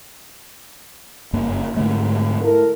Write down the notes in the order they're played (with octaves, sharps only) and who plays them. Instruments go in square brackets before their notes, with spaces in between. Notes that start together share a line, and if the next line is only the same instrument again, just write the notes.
[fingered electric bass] F#1 G2 A#3
G#2 D3 A3
[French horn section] E4 A4 A#4